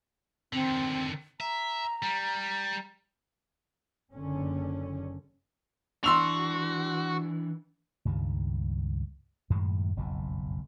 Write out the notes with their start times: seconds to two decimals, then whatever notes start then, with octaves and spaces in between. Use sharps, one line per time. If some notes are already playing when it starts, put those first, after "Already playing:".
0.53 D3 D#3 C4
1.41 E5 A#5
2.02 G3
4.13 F#1 D3 C#4
6.04 E3 D4 F#4 C6 E6 F7
8.05 C#2 G2 D#3 G3
9.50 F#2 A2 D#3 G#3
9.97 F#1 B1 F2 A2